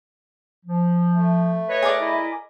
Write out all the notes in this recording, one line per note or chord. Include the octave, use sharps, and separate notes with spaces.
F3
A3
B4 C#5 D#5
G#4 A#4 D5
E4 D#5